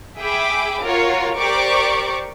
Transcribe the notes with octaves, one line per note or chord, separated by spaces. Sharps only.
G#4 E5 G5 B5 D6
F4 F#4 A#4 C#5
G4 A#4 C5 D5 C#6 D6